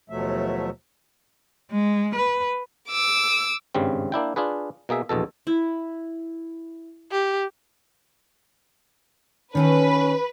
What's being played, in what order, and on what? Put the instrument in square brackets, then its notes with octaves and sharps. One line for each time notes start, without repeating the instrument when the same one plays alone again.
[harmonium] D#2 B2 F3 F#3 A3 E5
[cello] G#3
B4
[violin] D6 E6
[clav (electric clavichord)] G#1 G2 C#3 G3 C4
A#3 D4 E4 G5
D4 F4 G#4 B4
B2 A#3 G#4 E5
A#1 E2 B2 A4
[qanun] E4
[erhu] G4
[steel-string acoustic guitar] D#3 F#4 A4 [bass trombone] C#4 [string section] B4